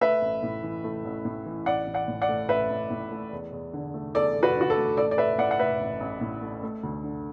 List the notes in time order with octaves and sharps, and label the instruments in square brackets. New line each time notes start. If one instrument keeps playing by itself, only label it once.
[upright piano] A3 B4 E5
A1
A2
E3
A3
A1
A2
E3
A1 D5 F#5
A1
D5 F#5
A2
D5 F#5
A3
A1 B4 E5
A1
A2
A3
E2
E2
D3
A3
E2 A4 D5
E2
F#4 B4
D3 F#4
A4
A3
A1 A4 D5
D5
A1 B4 E5
A2 D5 F#5
F#5
A3 B4 E5
A1
A1
A2
A3
A3
D2
D3